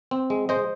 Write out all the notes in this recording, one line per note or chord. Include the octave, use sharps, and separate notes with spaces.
C4
G#3
G#3 C5 D#5